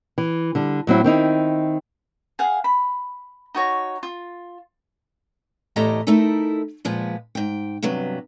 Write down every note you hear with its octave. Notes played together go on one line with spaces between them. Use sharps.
E3
D3 G3
A2 F#3 C4 E4
D#3 C4 D#4 E4
G#4 F5 F#5
B5
D#4 F#4 C#5
F4
E2 A2 G4 A4 D#5 A#5
A3 D#4 E4 A4 A#4
A#2 F3 G#3 B3
G#2 G5
G2 C3 F#3 B3